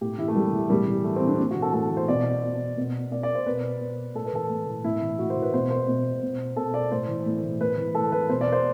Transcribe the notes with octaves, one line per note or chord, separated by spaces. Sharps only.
A2 G4
E3 E4
A3
A2 G3
E3
A2 G3
E3
A2 A3
C4
E3
D4
A2
F#4
E3
A4
A2 A4
E3
C5
B2 D5
B2
B2
B2 D5
D5
C5
B2 B4
B2
A2 A4
B4
E3 A4
A2
E3
A2 E4
E3
A2 F#4
C5
E3
B4
B2 C5
C5
B2
B2
B2 A4
D5
A2 C5
E3
A2
E3
A2 B4
E3
A2 A4
E3 B4
B2 C5
D5
C5